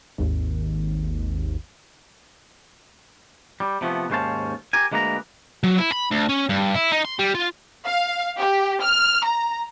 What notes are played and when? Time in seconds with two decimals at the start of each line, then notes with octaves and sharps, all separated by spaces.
0.18 G#1 D#2
3.60 G3
3.81 C3 F3 A3 B3
4.10 D#2 G#2 C#4 C5 F5 A5
4.73 G4 A#4 G#5
4.92 D2 G#3 A#3 B4 F5 A#5
5.64 F#3
5.78 E4
5.92 B5
6.12 D2
6.29 C#4
6.49 G2
6.75 E4
6.92 D#4
7.05 C6
7.19 G3
7.35 F4
7.86 F5
8.38 G4
8.81 F6
9.25 A#5